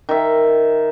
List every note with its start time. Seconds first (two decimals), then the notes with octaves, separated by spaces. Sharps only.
0.09 D#3 E5